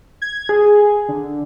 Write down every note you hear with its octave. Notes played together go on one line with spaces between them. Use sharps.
G#6
G#4
G#4
D3